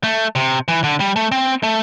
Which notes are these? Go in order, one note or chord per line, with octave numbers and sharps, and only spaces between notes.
A3
C3
E3
D3
G3
A3
C4
A3